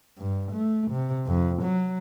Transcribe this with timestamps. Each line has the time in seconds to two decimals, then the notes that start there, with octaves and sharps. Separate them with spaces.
0.18 G2
0.52 A3
0.92 C3
1.27 F2
1.63 F#3